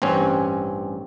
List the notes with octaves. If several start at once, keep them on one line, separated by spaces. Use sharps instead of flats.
A1 G2 C4 C#4 G#5